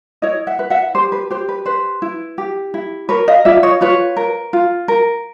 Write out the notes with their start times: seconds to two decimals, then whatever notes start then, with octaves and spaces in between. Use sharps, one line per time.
0.22 E4 C#5 D#5
0.47 E5 F#5
0.59 B4
0.70 E5 F#5
0.95 G4 C5
1.12 B4
1.30 G4 C5
1.49 B4
1.66 B4 C5
2.02 E4
2.38 G4
2.74 E4
3.09 A#4 B4 C#5
3.28 D#5 F5
3.45 F4 D5 E5
3.63 C#5 D#5
3.81 F4 B4 C#5
4.17 A#4
4.53 F4
4.88 A#4